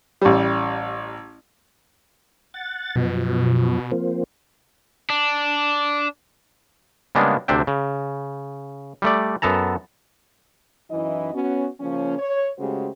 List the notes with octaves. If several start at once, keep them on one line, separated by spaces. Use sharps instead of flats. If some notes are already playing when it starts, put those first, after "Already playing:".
A1 G3
F#5 A6
F#2 B2 F3
F3 A#3 C4
D4
C#3 G3 G#3 A#3 B3 D4
D2 C3 D4 E5 G5
C#3
G3 A3 D5
F#2 B3 A4 A5 A#5
F#2 E3 D#4 E4 D#5
B3 C#4 F#4
C#3 F3 A#3 C#4
C#5
C#3 G#3 A3 F#4 G4 C5